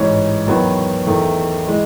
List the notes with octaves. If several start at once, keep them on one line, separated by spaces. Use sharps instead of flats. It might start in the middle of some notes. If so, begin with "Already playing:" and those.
Already playing: A1 G#2 E3 C#5
E2 D#3 F#3 B3
E2 D#3 A3
E3 G#3